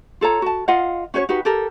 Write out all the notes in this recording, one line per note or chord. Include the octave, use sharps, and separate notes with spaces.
F4 A4 C#5 A#5
F#4 A5
F4 D#5 F5 F#5
C#4 F#4 C5 C#5
D#4 F#4 G4 B4
G4 A4 A#4